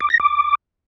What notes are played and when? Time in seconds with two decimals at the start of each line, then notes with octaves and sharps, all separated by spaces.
0.01 D6
0.10 A#6
0.20 D6